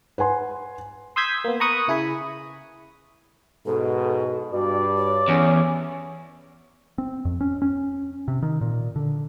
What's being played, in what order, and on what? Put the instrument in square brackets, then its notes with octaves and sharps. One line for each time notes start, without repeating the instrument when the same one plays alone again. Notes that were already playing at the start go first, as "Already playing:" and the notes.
[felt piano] B4 F#5 G#5 C6
[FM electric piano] C6 D#6 E6 G6 G#6 B6
A#3 B3
A#5 B5 C#6 D#6 F#6
C#3 E4 G#4 G#5 B5
[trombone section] G#2 B2 [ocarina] A4
[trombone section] G2 [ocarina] F#4 [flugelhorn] D5
[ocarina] C#5
[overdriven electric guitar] E2 [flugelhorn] C#4
[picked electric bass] C4
F2
C#4
C#4
C3
D#3
A#2
D3